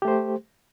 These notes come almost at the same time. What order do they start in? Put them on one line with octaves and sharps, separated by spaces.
G4 A3 C5